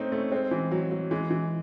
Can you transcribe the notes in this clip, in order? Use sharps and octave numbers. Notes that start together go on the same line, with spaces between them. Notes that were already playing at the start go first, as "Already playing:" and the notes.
Already playing: A3 C4 C#4 D#4
A3 C#4
G#3 C4
E3
F#3
F#3
E3 G#3
E3